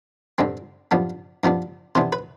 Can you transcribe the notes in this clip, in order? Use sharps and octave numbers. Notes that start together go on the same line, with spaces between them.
G2 D3 G3 C4
G2 F3 B3 D4
G2 F3 B3 D4
C3 E3 B3 D4 C5
B4